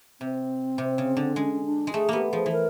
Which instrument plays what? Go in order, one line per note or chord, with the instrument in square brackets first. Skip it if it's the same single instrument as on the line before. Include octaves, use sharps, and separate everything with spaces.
[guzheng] C3 [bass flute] C4
[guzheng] C3
C#3
D3
[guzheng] G#3 [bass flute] C#4
[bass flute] D4
[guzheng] G#3
[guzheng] A3 [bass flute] G#4
[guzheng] A#3 B3 [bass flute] G4
[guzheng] F3 [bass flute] G#4
[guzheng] E3
[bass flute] A#4